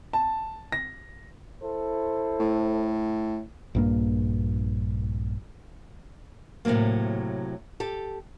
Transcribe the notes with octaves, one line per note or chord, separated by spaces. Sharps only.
A5
A#6
E4 A4 C5
A2
A#1 G2 A#3
A2 C3 E3 F#3 A#3
G4 A4